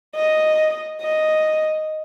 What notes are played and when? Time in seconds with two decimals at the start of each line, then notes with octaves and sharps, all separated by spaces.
0.15 D#5
1.01 D#5